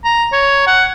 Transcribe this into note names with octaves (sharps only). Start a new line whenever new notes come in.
A#5
C#5
F#5